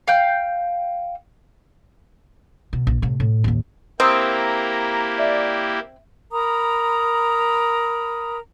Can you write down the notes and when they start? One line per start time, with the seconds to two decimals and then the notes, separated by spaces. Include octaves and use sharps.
0.08 F5 G5 G6
2.73 B2
2.87 A#1
3.02 A2 C3
3.20 A2
3.44 A1 D#2
4.00 A#3 C4 E4 G4 A#5 D#6 E6
5.18 D5 E5
6.32 A#4 A#5 B5 D#6